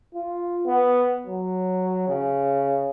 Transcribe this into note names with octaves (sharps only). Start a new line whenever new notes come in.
F4
B3
F#3
C#3